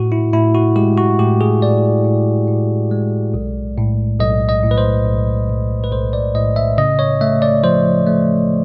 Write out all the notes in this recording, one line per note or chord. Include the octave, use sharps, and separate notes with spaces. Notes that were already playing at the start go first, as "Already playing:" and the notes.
Already playing: A2 F#4
E4
A2 E4
F#4
G#3 G4
F#4
A2 G4
G#4
A2 D5
A2
A2
G#3
B1
A2
B1 D#5
D#5
A2
B4
C5
B1
B1
B4
B1 C5
D5
A2 D#5
E5
C#3 D#5
C#5
A3 E5
D5
F3 C5
A3